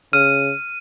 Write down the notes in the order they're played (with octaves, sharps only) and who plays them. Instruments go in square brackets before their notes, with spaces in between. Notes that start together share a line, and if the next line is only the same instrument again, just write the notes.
[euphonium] C#3 [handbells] F6 [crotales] D#7